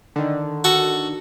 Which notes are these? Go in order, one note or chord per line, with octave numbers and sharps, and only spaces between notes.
D3 D#3
F#4 A4